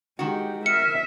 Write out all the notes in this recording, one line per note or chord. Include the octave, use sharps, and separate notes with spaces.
D#3 G#3 F#4 G4
A#4 E5 F6 C#7